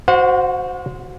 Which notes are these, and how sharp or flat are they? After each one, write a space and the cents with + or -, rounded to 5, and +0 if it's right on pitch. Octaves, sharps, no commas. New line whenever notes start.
F#4 +0 C5 -10 F#5 -45